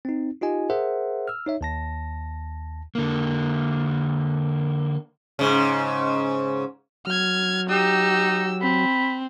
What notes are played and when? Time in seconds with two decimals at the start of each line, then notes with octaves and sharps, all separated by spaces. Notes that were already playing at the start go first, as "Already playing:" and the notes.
0.05 C4 D#4
0.42 D#4 F4 G4 D#5 G#5
0.70 G#4 A#4 C5 E5 F#5
1.28 E6 F6
1.47 D#4 C#5 E5
1.61 D#2 A5 A#6
2.95 D3 A#3
5.39 G#2 C#3
7.07 F#3 F6 G#6
7.69 D#4 G4 E6
8.62 C4 B5